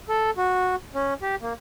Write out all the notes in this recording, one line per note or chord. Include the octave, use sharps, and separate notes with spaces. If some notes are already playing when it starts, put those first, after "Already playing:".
A4
F#4
C#4
G4
A#3